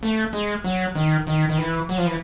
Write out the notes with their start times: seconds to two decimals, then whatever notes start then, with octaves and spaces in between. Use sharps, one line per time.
0.03 A3
0.33 G#3
0.64 F#3
0.95 D#3
1.27 D#3
1.49 D#3
1.58 E3
1.89 F#3
1.98 F3
2.06 E3